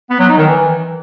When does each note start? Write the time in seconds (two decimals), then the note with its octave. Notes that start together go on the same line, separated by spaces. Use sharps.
0.10 B3
0.19 F#3
0.28 D#4
0.38 D#3
0.47 E3